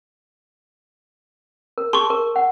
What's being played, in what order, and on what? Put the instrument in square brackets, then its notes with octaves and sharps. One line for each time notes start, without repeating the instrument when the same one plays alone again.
[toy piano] A#4
[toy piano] G#4 A5 [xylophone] C6 C#6
[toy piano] A#4
F#5